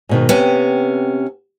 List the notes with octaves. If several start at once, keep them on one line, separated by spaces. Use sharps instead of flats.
G#2 B2 D#3
C3 B3 C#4 B4 G5